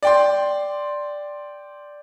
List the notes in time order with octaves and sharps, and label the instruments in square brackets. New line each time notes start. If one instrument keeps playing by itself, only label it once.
[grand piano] D5 G5 C6